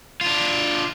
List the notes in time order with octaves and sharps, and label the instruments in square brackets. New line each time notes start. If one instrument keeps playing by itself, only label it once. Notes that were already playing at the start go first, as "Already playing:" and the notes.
[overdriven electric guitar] D4 F4